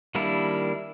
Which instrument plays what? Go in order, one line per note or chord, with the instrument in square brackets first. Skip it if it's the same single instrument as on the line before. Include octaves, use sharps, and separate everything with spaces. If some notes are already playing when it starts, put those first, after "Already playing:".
[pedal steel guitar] D#3 G3 A#3 D4 E4